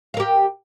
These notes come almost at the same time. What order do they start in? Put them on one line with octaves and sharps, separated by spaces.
F5 A#4 G4